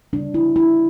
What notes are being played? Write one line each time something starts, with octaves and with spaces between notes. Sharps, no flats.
C#3 G3 D4
E4
E4